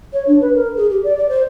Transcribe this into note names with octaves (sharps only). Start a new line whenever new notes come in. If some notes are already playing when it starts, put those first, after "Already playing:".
C#5
D4
B4
A#4
G#4
G4
D5
D5
C5